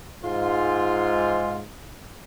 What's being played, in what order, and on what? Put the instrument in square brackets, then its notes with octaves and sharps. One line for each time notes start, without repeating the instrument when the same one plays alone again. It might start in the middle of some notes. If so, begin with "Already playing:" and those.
[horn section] G#2 F4